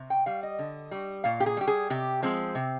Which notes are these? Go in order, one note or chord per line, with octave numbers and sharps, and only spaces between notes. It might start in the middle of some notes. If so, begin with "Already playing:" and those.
Already playing: C3
G5
G3 F5
D#5
D3
G3
A#2 F5
G4
G#4
G3 G4
G#4
C3 G4
F3 G#3 C4
C3